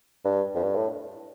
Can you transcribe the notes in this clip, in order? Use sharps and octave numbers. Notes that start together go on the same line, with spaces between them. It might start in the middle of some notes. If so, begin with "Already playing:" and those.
G2
F2
G2
A2